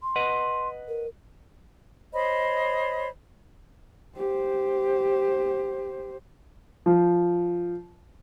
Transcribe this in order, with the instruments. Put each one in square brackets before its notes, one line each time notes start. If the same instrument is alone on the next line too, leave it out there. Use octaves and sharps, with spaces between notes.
[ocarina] C6
[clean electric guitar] B4 D#5 F#5
[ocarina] A#4
[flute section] C5 C#5 D#5 B5
[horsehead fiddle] G4 C5
[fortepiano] F3